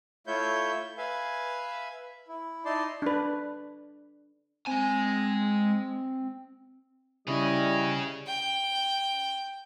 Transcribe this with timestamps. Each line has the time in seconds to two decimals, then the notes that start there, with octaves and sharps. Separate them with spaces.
0.27 A3 E4 F4 C#5 E5 G6
0.98 B4 E5 F5 G#5
2.28 E4
2.65 D#4 E4 D5 A5 C6
3.02 D4 B4
4.67 G#3 C4 G#5
7.28 C#3 G3 C#4 E4 G#4 C#5 D#5
8.27 G5